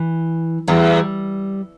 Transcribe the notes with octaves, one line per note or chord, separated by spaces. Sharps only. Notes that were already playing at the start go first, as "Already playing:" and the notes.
Already playing: E3
E2 G3